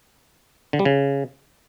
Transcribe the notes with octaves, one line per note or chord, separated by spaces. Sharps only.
D3
G3
C#3